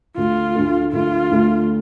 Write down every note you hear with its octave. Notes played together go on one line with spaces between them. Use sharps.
D2 D3 A3 F4
D2 D3 A3
D2 D3 A3 F4
D2 D3 A3